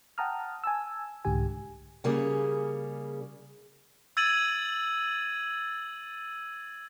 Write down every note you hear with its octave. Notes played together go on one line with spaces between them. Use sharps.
F#5 G5 A5 A#5 D#6 F6
G#5 A5 E6
C2 G#2 D3 G4 G#5
C#3 G3 A#3 C#4 G#4
E6 G#6 A6 D#7 F#7